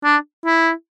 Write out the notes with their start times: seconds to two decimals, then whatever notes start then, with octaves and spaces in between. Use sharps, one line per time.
0.04 D4
0.46 E4